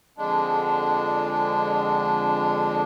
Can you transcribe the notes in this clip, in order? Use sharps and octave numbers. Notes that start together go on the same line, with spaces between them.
F2 D3 G#3 D4